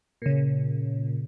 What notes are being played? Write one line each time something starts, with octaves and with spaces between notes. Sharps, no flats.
A#2 C#3